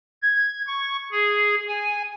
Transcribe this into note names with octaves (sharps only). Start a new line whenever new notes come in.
G#6
C#6
G#4
G#5